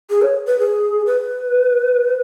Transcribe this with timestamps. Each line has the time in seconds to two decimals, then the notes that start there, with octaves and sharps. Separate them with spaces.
0.10 G#4
0.22 C#5
0.47 B4
0.59 G#4
1.06 B4